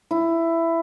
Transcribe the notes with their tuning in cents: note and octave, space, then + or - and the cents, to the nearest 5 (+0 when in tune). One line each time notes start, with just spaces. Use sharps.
E4 +10